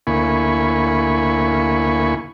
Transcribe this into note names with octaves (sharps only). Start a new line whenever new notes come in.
D2 A#3 E4 G#5 B5 C#6